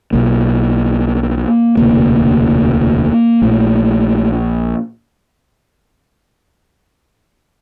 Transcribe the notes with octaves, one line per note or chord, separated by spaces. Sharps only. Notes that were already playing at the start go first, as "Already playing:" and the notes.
B1 B2 A#3
E1 D2 C3 A#3
A#1 A#2 A3